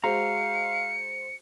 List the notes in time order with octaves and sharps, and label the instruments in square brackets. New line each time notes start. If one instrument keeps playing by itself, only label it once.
[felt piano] G#3 F#4 C5 [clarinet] F5 [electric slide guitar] A#5 [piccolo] C#7